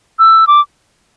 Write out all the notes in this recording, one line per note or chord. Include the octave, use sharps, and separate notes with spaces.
E6
D6